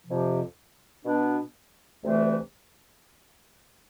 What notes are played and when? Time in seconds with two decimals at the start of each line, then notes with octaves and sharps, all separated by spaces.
0.06 F2 C3 F3
1.05 B2 B3 D4
2.03 D2 C3 E3 A3 D4